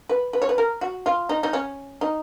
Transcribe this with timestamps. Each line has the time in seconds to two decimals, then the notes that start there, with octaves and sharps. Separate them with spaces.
0.09 B4
0.33 B4
0.42 C#5
0.49 B4
0.58 A#4
0.81 F#4
1.06 F4
1.29 D#4
1.43 D#4
1.53 C#4
2.01 D#4